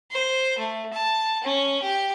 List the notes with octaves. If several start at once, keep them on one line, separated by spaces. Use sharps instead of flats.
C5
A3
A5
C#4
G4